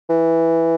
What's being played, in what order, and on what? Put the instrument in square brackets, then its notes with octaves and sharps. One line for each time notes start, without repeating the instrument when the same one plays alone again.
[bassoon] E3